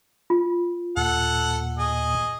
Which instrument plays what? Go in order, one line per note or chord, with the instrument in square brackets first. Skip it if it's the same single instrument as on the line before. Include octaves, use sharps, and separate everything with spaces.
[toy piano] F4
[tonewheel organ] D#2 A#2 [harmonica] A4 F#5
[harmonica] G#4 D#5